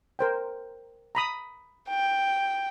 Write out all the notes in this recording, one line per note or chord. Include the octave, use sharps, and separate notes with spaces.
A#4 C5 G5
A#5 B5 D#6
G5